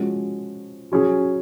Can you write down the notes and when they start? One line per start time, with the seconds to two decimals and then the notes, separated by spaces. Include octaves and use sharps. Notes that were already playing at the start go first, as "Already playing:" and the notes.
Already playing: F3 G#3 C#4 F#4
0.92 F#3 C#4 G#4